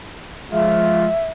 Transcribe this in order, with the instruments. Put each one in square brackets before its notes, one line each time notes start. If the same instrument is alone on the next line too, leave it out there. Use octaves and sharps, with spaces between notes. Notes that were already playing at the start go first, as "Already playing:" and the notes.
[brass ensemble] F3 G#3 F4 [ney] E5